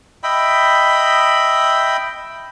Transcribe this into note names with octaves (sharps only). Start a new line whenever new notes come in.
D#5 E5 G5 B5